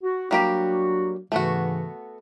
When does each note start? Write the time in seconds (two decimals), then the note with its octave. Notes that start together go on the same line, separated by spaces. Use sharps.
0.03 F#4
0.31 F#3 G3 A#3 D4 F#4 G4
1.32 G#2 C#3 E3 A3 B3 F#4